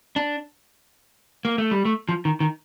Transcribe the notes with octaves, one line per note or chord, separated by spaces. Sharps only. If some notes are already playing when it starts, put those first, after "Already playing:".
D4
A#3
A3
G3
A3
F3
D#3
D#3